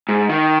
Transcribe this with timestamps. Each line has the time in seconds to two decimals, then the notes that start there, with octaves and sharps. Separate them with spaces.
0.09 G#2
0.29 D#3